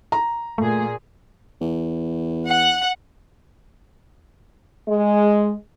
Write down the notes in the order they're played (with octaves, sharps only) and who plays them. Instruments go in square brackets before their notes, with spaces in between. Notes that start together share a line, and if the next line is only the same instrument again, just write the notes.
[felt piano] A#5
[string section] A#2 G#4 [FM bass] A3
[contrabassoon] E2
[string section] F#5
[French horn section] G#3